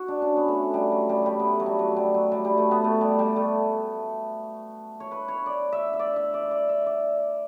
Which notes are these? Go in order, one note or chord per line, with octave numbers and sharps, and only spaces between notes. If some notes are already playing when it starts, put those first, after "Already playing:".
Already playing: F#4
D4
C#4
B3
A3
G3
F#3
G3
G3 A3
B3
A3
F#3
G3
F#3
G3
F#3
G3
G3
A3
B3
A3
G3
G3
A3
C#5
B4
C#5
D5
E5
E5
D5
E5
D5
D5
E5
D5